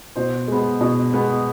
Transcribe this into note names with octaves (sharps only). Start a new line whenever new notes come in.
B2 C5
G#3 B3
B2
G#3 B3